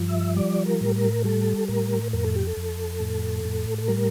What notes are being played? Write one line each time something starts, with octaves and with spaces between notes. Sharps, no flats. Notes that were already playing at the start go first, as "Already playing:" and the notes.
Already playing: G2 F3
E5
G3 D5
A#4
A2
A#4
G3 A4
A2 A#4
F2 A#4
A4
G4
A4
F2
A2
A2
A4
G3 A#4